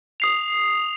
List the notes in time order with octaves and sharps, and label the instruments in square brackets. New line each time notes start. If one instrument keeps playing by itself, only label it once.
[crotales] D#6 C7 F7